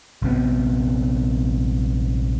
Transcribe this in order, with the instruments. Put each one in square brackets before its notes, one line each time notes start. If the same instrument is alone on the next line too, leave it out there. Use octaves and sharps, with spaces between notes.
[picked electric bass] A#1 C3 B3